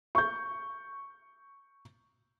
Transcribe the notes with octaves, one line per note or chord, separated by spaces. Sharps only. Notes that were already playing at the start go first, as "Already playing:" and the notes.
C#6 G6